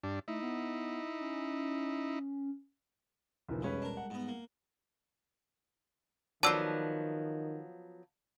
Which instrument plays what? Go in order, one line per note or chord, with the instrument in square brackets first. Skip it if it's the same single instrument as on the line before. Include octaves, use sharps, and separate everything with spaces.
[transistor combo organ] G2 D4
[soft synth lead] A3 [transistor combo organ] D#4 E4
[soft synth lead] B3
C#4
[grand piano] B1 E3 F3 [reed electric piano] E2 C#3 A#4
[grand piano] E1 C#4 B4 [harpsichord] C#3 [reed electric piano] G3 G#3
[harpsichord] D4 A#4
[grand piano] F#5
[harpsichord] G#2 B3
A#3
[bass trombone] D#3 [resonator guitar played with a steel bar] F3 F#3 B3 [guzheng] D5 C6 [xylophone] A5 E6